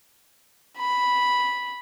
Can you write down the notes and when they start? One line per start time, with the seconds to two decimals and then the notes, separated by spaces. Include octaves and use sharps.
0.77 B5